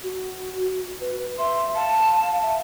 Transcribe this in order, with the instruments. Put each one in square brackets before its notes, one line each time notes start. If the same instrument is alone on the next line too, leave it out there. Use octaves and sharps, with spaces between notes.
[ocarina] F#4
B4
[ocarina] E5 [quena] C6
[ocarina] F5 [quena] A5
[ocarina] E5